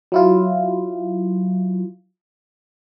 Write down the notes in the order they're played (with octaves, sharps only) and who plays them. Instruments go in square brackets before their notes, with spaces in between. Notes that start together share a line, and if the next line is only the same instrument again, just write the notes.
[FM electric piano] F#3 E4 F4